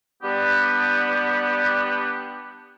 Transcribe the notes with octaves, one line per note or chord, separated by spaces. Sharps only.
G3 B3 D4 G4